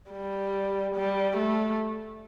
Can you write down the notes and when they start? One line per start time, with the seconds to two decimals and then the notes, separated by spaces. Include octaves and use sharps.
0.11 G3
0.95 G3
1.36 A3